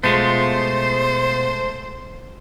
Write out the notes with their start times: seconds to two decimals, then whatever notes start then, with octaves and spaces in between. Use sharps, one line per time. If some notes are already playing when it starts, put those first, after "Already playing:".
0.04 B2 G#3 A3 F4 C5